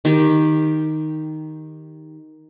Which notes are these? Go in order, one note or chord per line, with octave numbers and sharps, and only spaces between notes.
D#3 G4